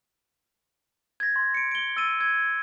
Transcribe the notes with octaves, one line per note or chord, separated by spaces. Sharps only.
G#6 A#6
C6
C#7 D7
D7 G7
E6 A6 D#7
G#6